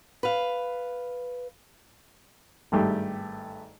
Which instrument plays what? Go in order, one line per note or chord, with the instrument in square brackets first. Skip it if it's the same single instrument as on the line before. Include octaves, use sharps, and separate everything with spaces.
[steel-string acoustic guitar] B4 F5
[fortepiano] G#1 G2 A3 G4